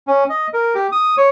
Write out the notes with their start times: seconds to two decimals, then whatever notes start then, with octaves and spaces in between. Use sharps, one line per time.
0.07 C#4
0.29 D#5
0.54 A#4
0.75 G4
0.92 D#6
1.17 C#5